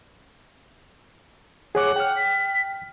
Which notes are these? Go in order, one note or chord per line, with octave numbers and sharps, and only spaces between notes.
G#4 C#5 F#5 D6
G5 F6
B6